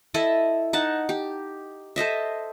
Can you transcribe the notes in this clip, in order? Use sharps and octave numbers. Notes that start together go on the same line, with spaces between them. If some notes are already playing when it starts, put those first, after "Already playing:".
E4 A4 D#5 E5
D#4 F#5 A5
G4
A4 C5 D#5 E5